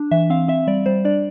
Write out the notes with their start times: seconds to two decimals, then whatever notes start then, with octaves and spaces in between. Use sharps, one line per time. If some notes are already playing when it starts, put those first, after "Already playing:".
Already playing: D4
0.11 E3 E5
0.30 C4 F5
0.48 C4 E5
0.67 G3 D5
0.86 G3 C5
1.05 D4 D5